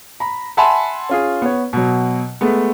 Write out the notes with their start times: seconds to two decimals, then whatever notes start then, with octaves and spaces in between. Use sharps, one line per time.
0.20 A#5 B5
0.57 E5 F#5 G#5 A5 B5 C6
1.09 C#4 F4 G#4
1.42 B3 C#5
1.73 B2 F#3
2.41 G#3 A3 B3